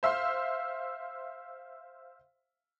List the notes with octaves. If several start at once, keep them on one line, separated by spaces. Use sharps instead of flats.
C5 E5 F5 C6